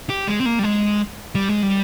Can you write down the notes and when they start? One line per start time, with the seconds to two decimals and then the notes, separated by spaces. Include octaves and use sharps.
0.10 G4
0.27 G#3
0.41 C4
0.46 A#3
0.59 G3
0.63 G#3
1.35 G3
1.49 G#3
1.63 G3